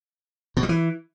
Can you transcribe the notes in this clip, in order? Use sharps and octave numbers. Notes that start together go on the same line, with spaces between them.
B2
G3
E3